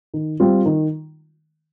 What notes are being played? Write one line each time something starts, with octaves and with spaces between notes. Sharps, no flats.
D#3
G3 C4 F4
D#3